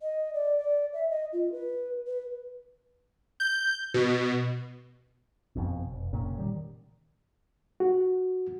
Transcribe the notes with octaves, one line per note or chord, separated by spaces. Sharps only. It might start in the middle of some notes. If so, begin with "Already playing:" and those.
D#5
D5
D5
E5
D#5
F4
B4
B4
G6
B2
F#1 F2 B2
F1
F1 A#2 C#3
D#3 G3
F#4